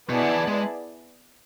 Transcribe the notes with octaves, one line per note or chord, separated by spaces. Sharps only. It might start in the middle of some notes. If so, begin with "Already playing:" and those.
B2 B3 E4 G#4 D5 A5
D3
E3
G#3